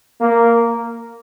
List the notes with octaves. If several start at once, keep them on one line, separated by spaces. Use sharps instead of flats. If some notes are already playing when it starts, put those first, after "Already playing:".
A#3